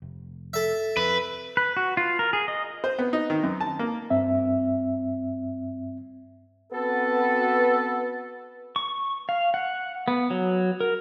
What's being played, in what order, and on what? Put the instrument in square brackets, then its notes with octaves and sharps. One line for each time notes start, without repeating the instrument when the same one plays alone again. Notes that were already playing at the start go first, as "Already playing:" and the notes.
[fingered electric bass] F1
[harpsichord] A4 E5
[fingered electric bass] F2 [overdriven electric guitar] B4
[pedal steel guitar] B4
F#4
F4
A#4
G#4
D#5
[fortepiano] C5
B3
D#4
D#3
F#2
A5
A#3
[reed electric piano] G2 C4 E5
[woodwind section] B3 C4 A4 [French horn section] F#4 B4
[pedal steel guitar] C#6
F5
F#5
B3
F#3
A#4